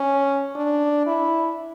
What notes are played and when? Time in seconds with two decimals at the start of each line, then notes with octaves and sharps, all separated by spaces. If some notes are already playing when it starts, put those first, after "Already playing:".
Already playing: C#4
0.56 D4
1.06 E4